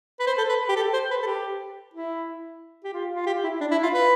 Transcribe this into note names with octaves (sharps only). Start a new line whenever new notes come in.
B4
C5
A4
B4
G4
A4
C5
B4
A4
G4
E4
G4
F4
F4
G4
E4
D4
E4
F4
B4